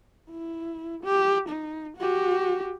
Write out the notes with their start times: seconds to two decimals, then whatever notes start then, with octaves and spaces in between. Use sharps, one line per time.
0.30 E4
1.04 G4
1.49 D#4
1.98 F#4 G4